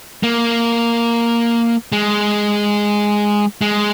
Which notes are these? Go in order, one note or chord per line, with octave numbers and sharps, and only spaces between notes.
A#3
G#3
G#3